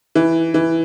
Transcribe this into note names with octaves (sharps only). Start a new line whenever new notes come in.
E3
E3